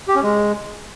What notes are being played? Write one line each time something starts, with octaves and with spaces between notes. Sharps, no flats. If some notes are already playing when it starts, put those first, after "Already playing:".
G4
C#4
G#3